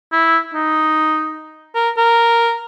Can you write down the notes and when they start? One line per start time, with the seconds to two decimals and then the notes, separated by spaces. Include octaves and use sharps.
0.13 E4
0.54 D#4
1.75 A#4
1.97 A#4